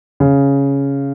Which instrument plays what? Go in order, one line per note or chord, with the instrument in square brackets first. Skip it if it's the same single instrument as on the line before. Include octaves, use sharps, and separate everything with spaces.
[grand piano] C#3